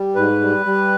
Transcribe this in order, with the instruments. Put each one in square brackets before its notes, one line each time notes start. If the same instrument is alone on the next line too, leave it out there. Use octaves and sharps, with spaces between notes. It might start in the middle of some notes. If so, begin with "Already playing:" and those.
Already playing: [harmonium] G3
G#2 B4
G3
G3